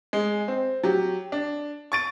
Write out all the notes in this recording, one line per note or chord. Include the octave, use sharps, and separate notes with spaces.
G#3
C4
F#3 G4
D4
C#6 A6 D7